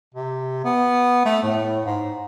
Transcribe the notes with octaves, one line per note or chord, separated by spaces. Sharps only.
C3
B3
A3
A2
G#2